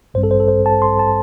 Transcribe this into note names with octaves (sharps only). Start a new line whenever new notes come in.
A1 G2 G3 C4 C5
A4
C5
A4
C5
A5
C6
A5